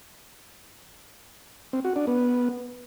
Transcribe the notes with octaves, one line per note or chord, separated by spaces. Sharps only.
C4
F#4
D4
B3